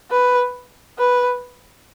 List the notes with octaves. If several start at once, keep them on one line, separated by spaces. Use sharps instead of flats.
B4
B4